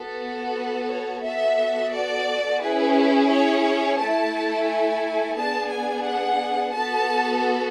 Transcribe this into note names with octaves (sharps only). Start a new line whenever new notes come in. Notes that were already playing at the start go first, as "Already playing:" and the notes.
Already playing: B3 F#4 A4
B4
C#5
B3 F#4 A4 E5
D5
C#4 E4 G#4 B4
C#5
A3 E4 A4 A5
G#5
B3 D4 G#4 A5
G#5
F#5
B3 F#4 A4 A5